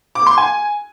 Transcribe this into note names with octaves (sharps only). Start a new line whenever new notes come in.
D6
C6
G#5